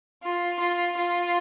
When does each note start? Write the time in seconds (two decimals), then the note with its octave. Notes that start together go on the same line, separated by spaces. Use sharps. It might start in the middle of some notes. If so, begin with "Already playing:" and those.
0.23 F4
0.59 F4
0.97 F4